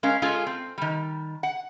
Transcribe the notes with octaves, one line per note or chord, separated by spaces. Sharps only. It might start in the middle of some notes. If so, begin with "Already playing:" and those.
G#3 C#4 A#4 F5
G#3 C#4 F4 G#4 A4
C4
D#3 G3
F#5